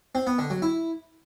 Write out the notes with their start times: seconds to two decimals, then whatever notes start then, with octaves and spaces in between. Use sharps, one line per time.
0.15 C4
0.27 B3
0.39 D3
0.50 F#3
0.62 E4